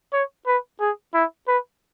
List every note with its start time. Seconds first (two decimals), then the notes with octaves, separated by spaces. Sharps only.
0.13 C#5
0.47 B4
0.81 G#4
1.14 E4
1.48 B4